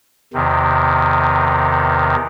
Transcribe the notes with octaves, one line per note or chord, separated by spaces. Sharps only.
E2 C3 D#3